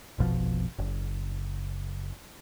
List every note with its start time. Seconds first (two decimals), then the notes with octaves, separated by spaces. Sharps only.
0.19 F1 A#1 B2 F3
0.79 F#1